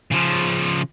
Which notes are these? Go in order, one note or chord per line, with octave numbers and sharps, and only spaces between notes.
C#3 F3